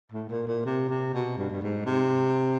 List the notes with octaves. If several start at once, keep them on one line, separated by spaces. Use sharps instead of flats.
A2
A#2
A#2
C3
C3
B2
G2
G2
G#2
C3